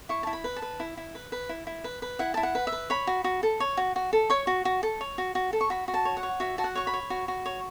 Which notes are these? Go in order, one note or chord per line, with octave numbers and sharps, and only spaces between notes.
E4 C#6
E4 A5
B5
B4
A5
B4
E4
E4
B4
B4
E4
E4
B4
B4
E4 F#5
E4 A5
F#5
B4
E5
B4
C#5 B5
F#4
F#4
A4
C#5
F#4
F#4
A4
C#5 C#6
F#4
F#4
A4
C#5
F#4
F#4
A4
C#6
F#4 B5
F#4
A5
C#5
F#5
C#5
F#4 E5
F#4 A5
F#5
C#5 C#6
B5
C#5
F#4
F#4
C#5